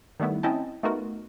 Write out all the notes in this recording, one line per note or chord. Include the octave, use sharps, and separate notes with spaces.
D#3 G3 A3 B3 E4
C4 C#4 E4 D#5 G5 A5
A3 B3 D#4 F4 F#4 A#4